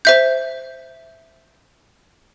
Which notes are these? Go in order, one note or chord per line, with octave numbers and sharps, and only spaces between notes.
C5 E5 G6